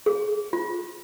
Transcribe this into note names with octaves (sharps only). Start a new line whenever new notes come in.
G#4
F4